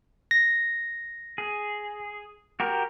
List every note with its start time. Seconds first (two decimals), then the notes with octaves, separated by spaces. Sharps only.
0.31 A#6
1.38 G#4
2.60 F#4 G4 A#4